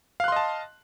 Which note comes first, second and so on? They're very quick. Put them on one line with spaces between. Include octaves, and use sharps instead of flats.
F5 F#6 C6 D#5 A5